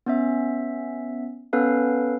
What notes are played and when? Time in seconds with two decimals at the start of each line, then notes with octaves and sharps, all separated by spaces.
0.06 B3 C#4 E5
1.53 B3 C#4 A4 B4 F5